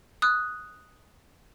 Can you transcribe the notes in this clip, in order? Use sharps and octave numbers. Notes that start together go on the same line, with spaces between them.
D#6 F#6